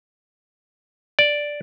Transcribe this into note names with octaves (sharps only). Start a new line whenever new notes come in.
D5